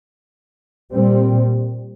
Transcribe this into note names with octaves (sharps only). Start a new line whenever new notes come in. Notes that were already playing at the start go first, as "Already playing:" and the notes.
A#2 G3 C4